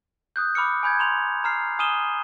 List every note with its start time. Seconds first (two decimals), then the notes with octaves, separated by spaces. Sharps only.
0.36 D#6 F#6 G6
0.55 B5 D6 F6 C#7
0.83 G#5 B5 G6 G#6
0.99 A#5 C6 F7
1.44 A#5 F6 C7
1.79 G#5 D#6 F6 D#7 E7 G7